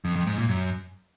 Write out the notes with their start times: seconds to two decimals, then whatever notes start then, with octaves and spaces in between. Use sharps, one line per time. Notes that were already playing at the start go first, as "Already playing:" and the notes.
0.05 F2
0.16 F2
0.27 G#2
0.38 A#2
0.49 F#2